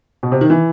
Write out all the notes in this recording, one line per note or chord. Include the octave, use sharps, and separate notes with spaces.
B2
C3
D#3
E3